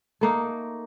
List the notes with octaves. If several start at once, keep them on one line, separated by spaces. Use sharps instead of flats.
A3 A#3 D#4